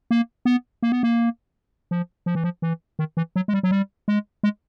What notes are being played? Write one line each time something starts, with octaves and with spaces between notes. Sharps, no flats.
A#3
B3
A#3
B3
A#3
F3
F3
E3
F3
E3
D#3
E3
F#3
G#3
G3
F#3
G3
G#3
G#3